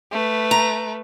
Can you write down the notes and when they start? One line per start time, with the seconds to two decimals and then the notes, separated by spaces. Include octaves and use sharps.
0.12 A3 B4
0.51 A#5